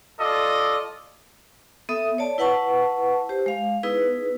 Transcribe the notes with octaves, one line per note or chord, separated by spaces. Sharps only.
F4 A4 D5 D#5
B3 A4 E5 D#6
C#5 D5 A5
E4 B4 F#5 A5 C#6
G4 C5
G#3 F5
B3 D#4 E4 G#4 B4